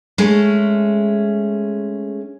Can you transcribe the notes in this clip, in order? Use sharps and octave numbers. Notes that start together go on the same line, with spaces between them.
G#3 A3 C#4